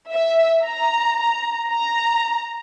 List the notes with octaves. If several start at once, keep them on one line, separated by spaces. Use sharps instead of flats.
E5
A#5
A#5
A#5